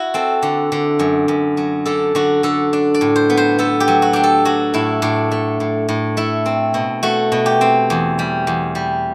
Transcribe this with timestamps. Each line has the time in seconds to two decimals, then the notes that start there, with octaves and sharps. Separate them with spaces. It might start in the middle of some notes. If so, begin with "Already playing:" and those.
Already playing: E4 F#4
0.14 C4 A4
0.43 D3
0.72 D3
0.99 F#2
1.28 F#2
1.57 F#3
1.86 D3 A4
2.15 D3 F#4
2.43 D3 A4
2.73 D4
2.94 D5
3.01 A2
3.16 C5
3.30 B3
3.37 C5
3.58 B3 A4
3.80 G4
3.88 F#3
4.02 F#4
4.13 D4 G4
4.24 A4
4.45 F#3 F#4
4.74 A2 E4
5.02 A2 D4
5.31 A3
5.60 A2
5.89 A2
6.17 A3 E4
6.46 C4
6.74 B2
7.03 A3 F#4
7.32 B2
7.46 G4
7.61 C4
7.90 E2
8.19 G3
8.47 E2
8.75 G3